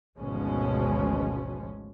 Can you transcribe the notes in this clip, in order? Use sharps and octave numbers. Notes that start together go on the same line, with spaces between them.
G#1 D2 B2 F3 G#3 C#4